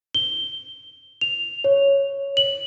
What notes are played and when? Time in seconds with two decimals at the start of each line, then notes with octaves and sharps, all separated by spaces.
0.15 G7
1.21 F7
1.64 C#5
2.37 F#7